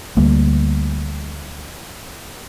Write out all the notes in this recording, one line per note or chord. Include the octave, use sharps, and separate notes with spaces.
D2 G3 A#3